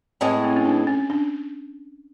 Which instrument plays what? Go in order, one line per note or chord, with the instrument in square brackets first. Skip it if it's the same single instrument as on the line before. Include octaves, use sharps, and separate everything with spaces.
[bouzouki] A2 E3 G#3 [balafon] C4
[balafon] C4
C#4
D4
C#4
D4